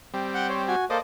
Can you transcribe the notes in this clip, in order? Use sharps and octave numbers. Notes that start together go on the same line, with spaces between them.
G3 C4
F#5 G5
C5 C#5
F#4 G#5
A#3 A4 C5 D5 D#5